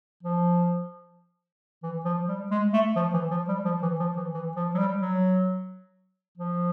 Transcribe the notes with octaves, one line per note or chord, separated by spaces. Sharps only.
F3
E3
F3
G3
G#3
A3
F3
E3
F3
G3
F3
E3
F3
E3
E3
F3
F#3
G3
F#3
F3